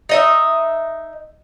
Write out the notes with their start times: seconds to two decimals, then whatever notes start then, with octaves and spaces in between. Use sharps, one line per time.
0.09 D#4 D#5 E5